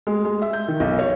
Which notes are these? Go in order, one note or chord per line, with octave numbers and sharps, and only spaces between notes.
G#3
G#3
E5
G6
D#3
B1
C#5